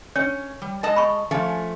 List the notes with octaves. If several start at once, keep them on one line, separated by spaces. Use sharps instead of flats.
C#4 C#5
G3
G#3 D#5 A5
B5 C#6
F3 A3 C#4